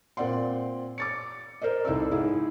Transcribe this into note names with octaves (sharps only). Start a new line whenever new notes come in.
A#2 C4 D5 F#5 C6
D6 A6 C#7
A#4 C5 D5 D#5
C2 D#4 E4 A4 D5 E6
G#2 E4 G#4